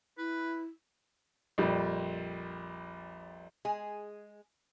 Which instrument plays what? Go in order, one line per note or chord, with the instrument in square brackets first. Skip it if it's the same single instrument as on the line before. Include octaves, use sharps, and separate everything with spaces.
[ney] E4 [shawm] B4
[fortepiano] A#1 F2 G3
[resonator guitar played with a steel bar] G#3 G#4 G#5